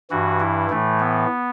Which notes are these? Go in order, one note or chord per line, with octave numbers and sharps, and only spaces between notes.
G2 E3 F#4
E4
A2 E3 A3
B3